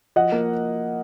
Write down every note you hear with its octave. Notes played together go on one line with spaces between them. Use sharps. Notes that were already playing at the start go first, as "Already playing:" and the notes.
F3 D#5 F#5
A#3